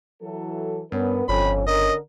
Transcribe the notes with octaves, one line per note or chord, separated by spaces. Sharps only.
E3 F#3 A4
G2 B3 C#4 A#4 B4
G1 F2 C#4 B5
D3 C#4 A#4 D#5